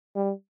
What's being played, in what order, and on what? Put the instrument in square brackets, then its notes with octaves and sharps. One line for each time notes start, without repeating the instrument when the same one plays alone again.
[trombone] G3